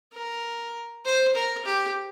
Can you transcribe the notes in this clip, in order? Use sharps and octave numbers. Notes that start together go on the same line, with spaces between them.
A#4
C5
A#4
G4